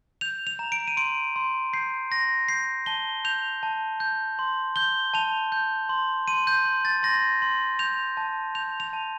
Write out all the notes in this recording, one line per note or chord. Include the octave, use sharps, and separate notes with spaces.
G6 F7
F7
A#5
D7
D#7
C6 D7
C6
G6 C7
C6 A#6
G6 C7
A5 G7
G6 F7
A5
G6
C6
G6 G7
A5 F7
G6
C6
C6 D#7
G6
C6
A6
C6 A#6
C6
G6 F7
A5
G6 F7
F7
A5